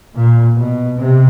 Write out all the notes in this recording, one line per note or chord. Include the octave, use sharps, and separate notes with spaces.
A#2
B2
C3